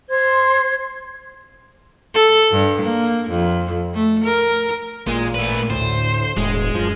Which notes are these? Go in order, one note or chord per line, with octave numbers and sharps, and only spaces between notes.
C5 C6 G#6
A4
G2
A#3
F2
A3
A#4
A1 A#2 G#3
A3 B4
D2 A2 C5
E1 A2 G#3
F#2 F3